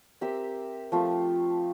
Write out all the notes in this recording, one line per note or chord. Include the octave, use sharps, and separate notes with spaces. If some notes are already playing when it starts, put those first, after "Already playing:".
C4 G4 A#4 E5
F3 A3 C4 F4